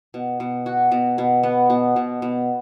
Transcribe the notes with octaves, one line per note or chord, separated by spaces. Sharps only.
B2
B2
F#4
B2
B2
B3
B2
B2
B2